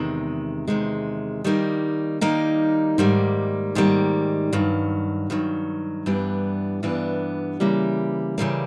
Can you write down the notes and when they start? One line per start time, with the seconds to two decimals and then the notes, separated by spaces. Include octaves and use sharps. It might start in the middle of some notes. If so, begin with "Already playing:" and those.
Already playing: E2 C3 D#3 G#3
0.67 E2 C3 D#3 G#3
1.44 D#3 G3 A#3 D#4
2.21 D#3 G3 A#3 D#4
2.98 G#2 D#3 G3 A#3
3.75 G#2 D#3 G3 A#3
4.53 G2 D#3 F#3
5.30 G2 D#3 F#3
6.06 G2 E3 G3 B3 D4
6.83 G2 E3 G3 B3 D4
7.60 C#3 E3 G3 A#3
8.38 C#3 E3 G3 A#3